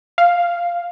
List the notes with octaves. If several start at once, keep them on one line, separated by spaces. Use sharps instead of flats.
F5